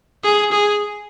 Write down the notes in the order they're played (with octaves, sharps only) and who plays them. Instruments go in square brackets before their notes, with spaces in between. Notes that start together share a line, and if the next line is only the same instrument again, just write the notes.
[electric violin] G#4
G#4